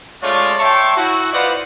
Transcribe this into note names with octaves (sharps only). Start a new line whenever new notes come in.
G#3 A3 C#4 F4 C#5 D5
C#5 E5 G5 A5 C6 C#6
E4 F#4
F4 B4 C5 D5 D#5 F#5